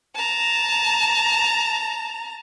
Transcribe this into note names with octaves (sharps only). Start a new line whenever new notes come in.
A5 A#5